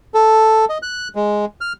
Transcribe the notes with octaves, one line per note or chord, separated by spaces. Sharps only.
A4
D#5
F#6
G#3
F6